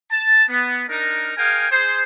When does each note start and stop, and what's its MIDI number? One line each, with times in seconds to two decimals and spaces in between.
0.11 0.42 81
0.49 0.82 59
0.88 1.33 62
0.88 1.33 63
0.88 1.33 70
1.37 1.66 68
1.37 1.66 70
1.37 1.66 77
1.37 1.66 79
1.37 1.66 80
1.71 2.03 68
1.71 2.03 72